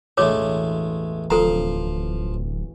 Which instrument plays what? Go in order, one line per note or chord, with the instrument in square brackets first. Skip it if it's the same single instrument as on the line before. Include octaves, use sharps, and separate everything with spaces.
[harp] E1 A1 [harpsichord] G#3 A3 [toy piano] C#5 D6
[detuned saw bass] D1 [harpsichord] F3 F5 [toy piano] A4 A#5